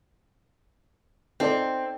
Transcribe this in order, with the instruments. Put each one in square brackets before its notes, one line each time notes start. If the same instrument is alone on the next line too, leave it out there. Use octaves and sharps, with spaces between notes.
[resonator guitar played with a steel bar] C4 [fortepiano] D#4 A4 D5